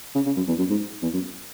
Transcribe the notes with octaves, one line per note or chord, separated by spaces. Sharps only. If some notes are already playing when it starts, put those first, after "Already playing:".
C#3
C#3
F#2
E2
F#2
G#2
E2
F#2